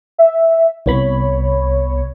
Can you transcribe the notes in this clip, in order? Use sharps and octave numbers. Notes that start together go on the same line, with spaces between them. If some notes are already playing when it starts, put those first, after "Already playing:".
E5
C2 B3 C#5 B5